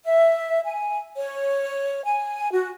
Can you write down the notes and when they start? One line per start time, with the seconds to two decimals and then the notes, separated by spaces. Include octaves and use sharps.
0.04 E5
0.65 G#5
1.16 C#5
2.04 G#5
2.51 F#4